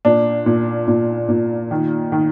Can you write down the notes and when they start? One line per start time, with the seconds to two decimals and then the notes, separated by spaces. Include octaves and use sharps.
0.05 A#2 D4
0.46 A#2
0.88 A#2
1.29 A#2
1.71 D#3
2.12 D#3